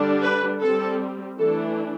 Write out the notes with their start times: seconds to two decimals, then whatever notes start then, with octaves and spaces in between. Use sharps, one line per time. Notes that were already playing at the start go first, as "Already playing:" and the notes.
Already playing: D3 G3 D4
0.22 B4
0.61 G3 C4 A4
1.38 E3 A3 D4 A4